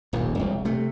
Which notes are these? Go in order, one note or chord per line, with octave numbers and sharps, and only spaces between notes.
D#1 A#1 D#2
E1 C2
C3 A3